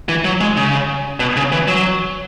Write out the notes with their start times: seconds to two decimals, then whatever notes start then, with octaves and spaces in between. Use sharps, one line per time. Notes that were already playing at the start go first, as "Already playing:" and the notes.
0.09 E3
0.25 F#3
0.41 G#3
0.56 C#3
1.20 B2
1.36 C#3
1.52 E3
1.68 F#3